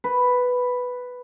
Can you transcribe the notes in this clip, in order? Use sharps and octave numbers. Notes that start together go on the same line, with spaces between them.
B4